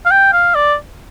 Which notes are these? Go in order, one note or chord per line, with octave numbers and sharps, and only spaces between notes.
F5
G5
F5
D5